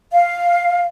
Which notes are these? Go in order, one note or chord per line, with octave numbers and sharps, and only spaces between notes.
F5